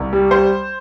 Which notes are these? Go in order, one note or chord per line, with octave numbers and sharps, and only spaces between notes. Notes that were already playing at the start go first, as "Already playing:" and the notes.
Already playing: C2
G3
G3 C5